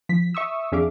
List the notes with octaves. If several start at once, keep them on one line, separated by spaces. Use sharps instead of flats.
F3 B6
E5 C#6 D#6 E6
F2 D4 G#4 E5 F5 D6